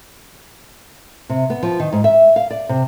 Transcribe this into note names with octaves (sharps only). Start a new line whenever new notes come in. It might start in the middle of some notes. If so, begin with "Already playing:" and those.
C3
B3
F3
D#3
G#2
E5
F5
D5
C3